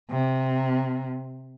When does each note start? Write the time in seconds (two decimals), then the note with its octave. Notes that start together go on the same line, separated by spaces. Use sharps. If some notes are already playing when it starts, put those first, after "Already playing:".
0.11 C3